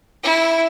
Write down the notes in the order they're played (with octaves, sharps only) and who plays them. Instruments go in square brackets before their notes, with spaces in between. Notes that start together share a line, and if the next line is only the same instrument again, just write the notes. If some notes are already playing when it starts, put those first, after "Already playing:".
[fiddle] E4